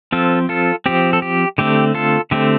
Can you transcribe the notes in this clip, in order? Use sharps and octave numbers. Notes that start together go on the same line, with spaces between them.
F3 C4 F4 A4
F4 A4
F3 C4 G4
A4
G4
D3 A3 C4 G4
F4 A4
D3 A3 C4 G4